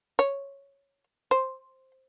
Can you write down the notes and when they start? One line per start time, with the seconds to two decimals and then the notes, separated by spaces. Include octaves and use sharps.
0.19 C#5
1.31 C5